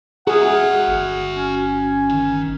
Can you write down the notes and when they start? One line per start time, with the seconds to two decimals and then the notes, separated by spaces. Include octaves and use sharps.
0.27 F#4 G#4 E5 F#5
0.88 G1
1.36 C#4
2.09 D#3